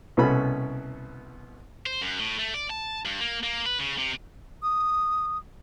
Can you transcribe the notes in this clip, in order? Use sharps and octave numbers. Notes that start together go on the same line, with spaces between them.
C2 B2 B3 C#4 A4 B5
C5
F#2
A2
A3
D5
A5
G2
A#3
A#3
B4
C#3
C3
D#6